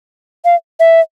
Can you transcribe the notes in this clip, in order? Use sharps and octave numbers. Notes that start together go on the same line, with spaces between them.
F5
E5